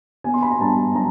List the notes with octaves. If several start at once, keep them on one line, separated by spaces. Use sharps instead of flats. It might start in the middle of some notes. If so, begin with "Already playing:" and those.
B3 G#5
C6
B5
A#5
G2 A5
F#3 A#5